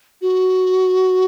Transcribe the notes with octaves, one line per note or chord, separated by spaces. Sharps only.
F#4